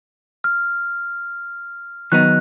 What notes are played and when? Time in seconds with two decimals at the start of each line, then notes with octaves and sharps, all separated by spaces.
0.44 F6
2.12 D#3 F#3 B3 D#4 F#6